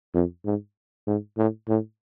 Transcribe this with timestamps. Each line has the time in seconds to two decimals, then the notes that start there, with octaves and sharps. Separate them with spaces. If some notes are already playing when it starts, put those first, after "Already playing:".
0.14 F2
0.45 G#2
1.07 G#2
1.38 A2
1.69 A2